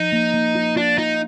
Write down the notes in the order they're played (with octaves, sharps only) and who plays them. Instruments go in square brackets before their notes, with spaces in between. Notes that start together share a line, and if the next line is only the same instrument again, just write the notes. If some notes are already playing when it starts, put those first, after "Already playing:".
Already playing: [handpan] F3 [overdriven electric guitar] D#4
[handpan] A#3
A#3
F4
[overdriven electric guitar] D4 [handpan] F4
[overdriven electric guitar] D#4 [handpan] F4